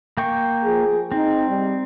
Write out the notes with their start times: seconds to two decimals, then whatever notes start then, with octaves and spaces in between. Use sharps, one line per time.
0.17 A#3 G5 C#6
0.63 F3 G#4
1.12 C4 D#4
1.48 G3